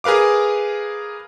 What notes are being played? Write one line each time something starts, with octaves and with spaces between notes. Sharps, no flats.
G#4 A#4 B4 F5 D6